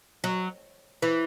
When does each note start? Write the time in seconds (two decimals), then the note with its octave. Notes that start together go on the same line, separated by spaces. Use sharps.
0.24 F#3
1.02 E3